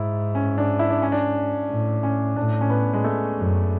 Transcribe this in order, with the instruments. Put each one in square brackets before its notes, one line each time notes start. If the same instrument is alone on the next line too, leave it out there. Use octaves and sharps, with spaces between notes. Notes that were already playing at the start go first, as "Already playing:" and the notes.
Already playing: [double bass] G#2 [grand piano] E4
[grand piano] C#4
D4
E4
D4
C#4
D4
[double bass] A2
[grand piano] C#4
[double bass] A2 [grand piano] D4
[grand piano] C#4
B3
G#3
A3
[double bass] F#2